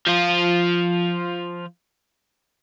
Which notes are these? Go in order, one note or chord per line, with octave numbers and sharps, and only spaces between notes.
F3 F4